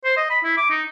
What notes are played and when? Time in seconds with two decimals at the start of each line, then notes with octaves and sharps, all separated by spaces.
0.05 C5
0.17 D#5
0.30 B5
0.44 E4
0.57 D6
0.70 D#4